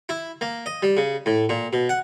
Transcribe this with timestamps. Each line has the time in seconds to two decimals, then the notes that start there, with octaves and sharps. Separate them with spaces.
0.09 E4
0.41 A#3
0.66 D#5
0.83 G3
0.97 C#3
1.26 A2
1.49 A#2
1.73 B2
1.89 F#5